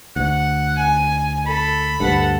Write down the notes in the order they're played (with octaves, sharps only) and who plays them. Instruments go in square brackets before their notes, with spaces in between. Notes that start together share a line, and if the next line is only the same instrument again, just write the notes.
[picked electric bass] D2 [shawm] F#5
[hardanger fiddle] G#5
[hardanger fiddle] A4 [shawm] B5
[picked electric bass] D2 G2 [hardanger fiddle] A4 F#5